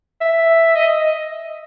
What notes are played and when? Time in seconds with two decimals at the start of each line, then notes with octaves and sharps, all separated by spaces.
0.21 E5
0.75 D#5